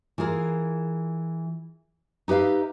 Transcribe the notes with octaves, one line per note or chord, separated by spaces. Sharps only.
E3 F4 G#4 A#4
D#4 G4 B4 E5 F5